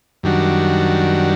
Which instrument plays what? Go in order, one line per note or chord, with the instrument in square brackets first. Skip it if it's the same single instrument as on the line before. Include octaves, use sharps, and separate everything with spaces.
[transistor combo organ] F#2 D#3 G3 D4 F#4